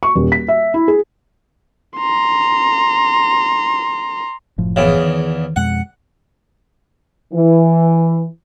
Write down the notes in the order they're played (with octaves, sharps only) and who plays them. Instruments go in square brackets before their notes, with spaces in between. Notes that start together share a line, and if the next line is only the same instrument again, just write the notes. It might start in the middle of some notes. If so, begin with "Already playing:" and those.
[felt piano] C#6
D#1
B6
E5
E4
G#4
[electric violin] A#5 C6
[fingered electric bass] F#1 A2 F3
[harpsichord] E2 C#3
[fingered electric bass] D#3
[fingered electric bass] F2 B2 G#3 [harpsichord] F#5
[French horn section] E3